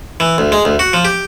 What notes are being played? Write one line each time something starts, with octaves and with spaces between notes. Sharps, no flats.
E3
D2
G#3
D2
F#4
F3
G4